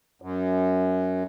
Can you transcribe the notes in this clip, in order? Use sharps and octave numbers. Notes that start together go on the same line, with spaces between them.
F#2